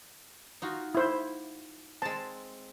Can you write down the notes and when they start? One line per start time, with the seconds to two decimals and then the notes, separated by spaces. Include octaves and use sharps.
0.62 D#4 F4 F#4
0.95 E4 C5
2.02 G#3 C4 A5